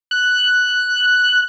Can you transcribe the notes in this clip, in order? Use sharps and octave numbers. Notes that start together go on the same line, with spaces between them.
F#6